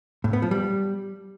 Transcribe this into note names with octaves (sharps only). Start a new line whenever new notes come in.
A2
B3
F3
G3